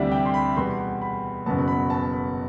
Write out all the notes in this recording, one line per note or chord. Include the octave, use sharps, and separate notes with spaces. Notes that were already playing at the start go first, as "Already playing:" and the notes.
Already playing: D2 C3 E3 G3 D4 E5
G5
C6
B5
E2 B2 G3 C6
B5
F#1 E2 B2 F#3 B3 A5
B5
A5
B5